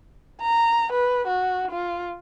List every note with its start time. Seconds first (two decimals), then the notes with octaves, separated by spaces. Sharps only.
0.41 A#5
0.93 B4
1.27 F#4
1.71 F4